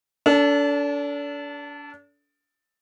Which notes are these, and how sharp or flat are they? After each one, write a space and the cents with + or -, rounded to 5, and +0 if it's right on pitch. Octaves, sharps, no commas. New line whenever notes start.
D4 -35 A4 +15